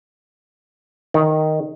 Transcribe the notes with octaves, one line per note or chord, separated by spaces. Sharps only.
D#3